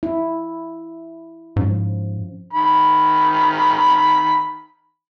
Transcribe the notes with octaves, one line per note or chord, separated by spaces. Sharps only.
E4
G#2 F3 C#4
D#3 B5